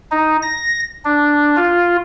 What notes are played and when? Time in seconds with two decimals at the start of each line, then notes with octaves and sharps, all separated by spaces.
0.11 D#4
0.42 A#6
1.05 D4
1.57 F4